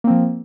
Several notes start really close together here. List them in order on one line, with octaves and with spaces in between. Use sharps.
A#3 C4 F3